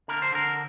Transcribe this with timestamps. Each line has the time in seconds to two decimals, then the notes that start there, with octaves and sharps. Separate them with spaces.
0.08 D3 A#4
0.22 C5
0.32 D3 A#4